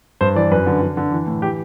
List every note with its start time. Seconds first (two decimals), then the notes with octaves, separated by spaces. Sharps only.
0.21 G2 C5
0.35 E3 D5
0.51 F#2 B4
0.67 D3
0.82 D3
0.97 D3
1.12 E3
1.27 A2
1.42 E3 G4